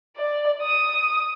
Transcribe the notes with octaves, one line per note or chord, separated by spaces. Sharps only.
D5
D#6